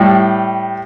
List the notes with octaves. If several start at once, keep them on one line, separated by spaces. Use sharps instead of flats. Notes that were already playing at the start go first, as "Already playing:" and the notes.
Already playing: A2 G3